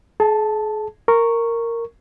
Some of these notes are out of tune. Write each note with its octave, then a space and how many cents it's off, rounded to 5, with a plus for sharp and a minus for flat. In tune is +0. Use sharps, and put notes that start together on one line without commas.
G#4 +40 A5 +0
A#4 -10 C#6 +0